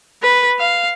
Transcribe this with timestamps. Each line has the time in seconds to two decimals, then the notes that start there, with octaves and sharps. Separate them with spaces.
0.23 B4
0.59 F5